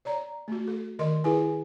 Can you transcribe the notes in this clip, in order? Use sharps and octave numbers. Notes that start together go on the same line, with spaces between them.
C#5 D5 A#5
A3 F#4
A4
D#3 A#4 D#5 C6
E4 G#4 B4 G#5